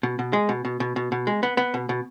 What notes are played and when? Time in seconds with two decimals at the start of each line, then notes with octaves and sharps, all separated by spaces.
0.03 B2
0.19 B2
0.33 G#3
0.49 B2
0.65 B2
0.80 B2
0.96 B2
1.12 B2
1.27 G#3
1.43 B3
1.57 B3
1.74 B2
1.89 B2